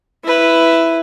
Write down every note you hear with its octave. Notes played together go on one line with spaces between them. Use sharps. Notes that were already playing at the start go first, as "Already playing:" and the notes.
E4 B4